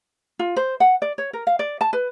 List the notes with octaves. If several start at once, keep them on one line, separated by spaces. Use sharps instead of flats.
F4
C5
F#5
D5
C#5
A#4
F5
D5
A5
B4